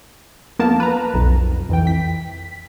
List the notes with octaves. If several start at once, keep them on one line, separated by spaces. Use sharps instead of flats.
F2 A#3 B3 A#4 A5
B4 A#5
B1 F2
F2 E3 G5
B6